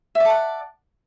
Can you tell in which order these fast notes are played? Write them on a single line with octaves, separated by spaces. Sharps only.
E5 D5 A5 F#5